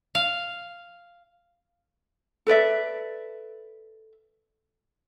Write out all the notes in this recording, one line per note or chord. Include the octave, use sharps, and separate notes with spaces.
F5
A4 B4 D5 E5